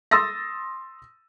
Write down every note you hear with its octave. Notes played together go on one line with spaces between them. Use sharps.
C6 D#6 E6 A6 A#6